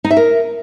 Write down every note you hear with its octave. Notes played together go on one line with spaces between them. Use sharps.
D#4
E5
A#4